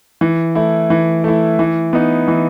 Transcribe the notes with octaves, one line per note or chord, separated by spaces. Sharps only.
E3
A3 E4
E3
A3 E4
E3
B3 D#4
E3